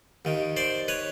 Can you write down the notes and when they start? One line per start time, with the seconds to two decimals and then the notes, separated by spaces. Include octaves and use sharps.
0.25 D#2 D#3
0.57 C5 D5
0.88 B4 C#5